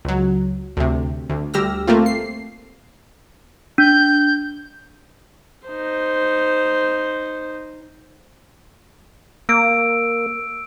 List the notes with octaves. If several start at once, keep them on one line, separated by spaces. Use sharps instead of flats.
C#2 F#3
D2 C3
D2
D2 G3 G4 E6 F6 A#6
A3 A#3 C4 F4
C7
D4 G6
D#4 C5
A#3 E6 D7